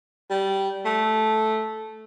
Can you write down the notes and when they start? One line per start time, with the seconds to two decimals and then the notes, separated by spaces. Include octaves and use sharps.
0.30 G3
0.85 A3